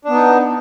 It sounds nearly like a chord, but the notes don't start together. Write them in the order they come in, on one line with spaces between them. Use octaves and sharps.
D4 B3 D#4